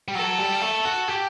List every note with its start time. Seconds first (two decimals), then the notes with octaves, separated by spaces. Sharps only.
0.08 G3
0.15 F#3 A4
0.39 G3
0.62 A3
0.85 F#4
1.08 G4